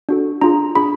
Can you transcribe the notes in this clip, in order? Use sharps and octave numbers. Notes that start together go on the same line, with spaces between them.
D4 F#4 A4
D4 F4 G#4 A#5
D4 F4 G#4 B5